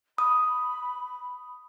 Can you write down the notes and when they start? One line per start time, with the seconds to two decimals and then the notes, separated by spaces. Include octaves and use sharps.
0.18 B5 D#6